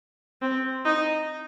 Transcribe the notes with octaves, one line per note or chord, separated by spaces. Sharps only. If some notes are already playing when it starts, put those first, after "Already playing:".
C4
D#4